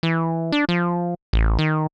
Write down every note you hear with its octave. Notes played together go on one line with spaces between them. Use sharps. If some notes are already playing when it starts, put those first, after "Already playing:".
E3
D4
F3
A1
D#3